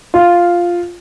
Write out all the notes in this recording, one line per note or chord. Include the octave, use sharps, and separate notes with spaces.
F4